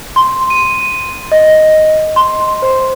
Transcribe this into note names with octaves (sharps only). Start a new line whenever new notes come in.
C6
D#7
D#5
C6
C5